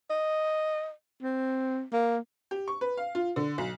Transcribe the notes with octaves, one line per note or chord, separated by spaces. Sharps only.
D#5
C4
A#3
G4
C#6
B4
F5
F4
D3
B1